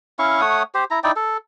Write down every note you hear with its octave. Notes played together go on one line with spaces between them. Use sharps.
C#4 E4 F5 C#6
A3 C#5 F#5 D#6
G4 C5
E4 A#5
D#4 E4 D5 G5
A4